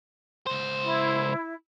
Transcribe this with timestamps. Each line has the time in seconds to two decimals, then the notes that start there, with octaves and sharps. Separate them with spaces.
0.47 C#2 C5
0.84 E4